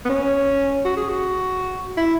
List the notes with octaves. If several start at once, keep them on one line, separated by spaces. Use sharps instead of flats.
B3
C#4
F#4
G#4
F#4
E4